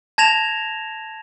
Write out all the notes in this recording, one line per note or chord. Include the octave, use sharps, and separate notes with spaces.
A5 G#6 A#6 E7 F7